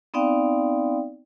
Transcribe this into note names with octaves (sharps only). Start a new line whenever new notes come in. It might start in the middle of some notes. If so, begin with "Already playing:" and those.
B3 C4 D#4 D5 F5 G5